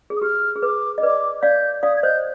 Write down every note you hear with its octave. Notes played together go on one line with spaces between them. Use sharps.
G#4
D#6
G4 F6
G#4
B4 D6
D#5
B4 D5 D6
D5 F5 G6
D5 F5 D#6
G#6
C5 D#5 G6